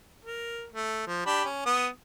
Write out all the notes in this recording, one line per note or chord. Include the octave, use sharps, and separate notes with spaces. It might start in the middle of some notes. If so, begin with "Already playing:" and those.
A#4
A3
F3
D4 G4 B5
C#4
B3 D#6